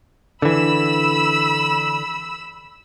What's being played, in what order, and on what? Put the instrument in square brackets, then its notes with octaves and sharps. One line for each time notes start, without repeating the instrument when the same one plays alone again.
[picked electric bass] D3 E3 [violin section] B5 E6